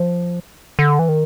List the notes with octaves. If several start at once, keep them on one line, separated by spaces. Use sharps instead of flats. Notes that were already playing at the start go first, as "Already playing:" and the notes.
Already playing: F3
D3
E3
D#3